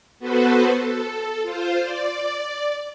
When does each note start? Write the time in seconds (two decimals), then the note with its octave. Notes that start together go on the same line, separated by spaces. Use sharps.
0.19 B3 F#4 A4 B4 C5
0.78 A4
1.42 F4 C5
1.81 D5